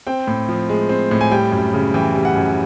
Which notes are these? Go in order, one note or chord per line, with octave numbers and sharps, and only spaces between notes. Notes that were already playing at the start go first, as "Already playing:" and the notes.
C4 G5
A2
F3
G#3
C4
A2
G#5
G3 G5
F#2
C#3
E3 G5
G3
F#5
F#2